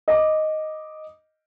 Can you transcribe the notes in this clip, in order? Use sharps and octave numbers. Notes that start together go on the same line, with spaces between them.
D#5 D6